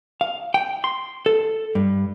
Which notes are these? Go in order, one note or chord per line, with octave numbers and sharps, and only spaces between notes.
F5
G5
C6
A4
G2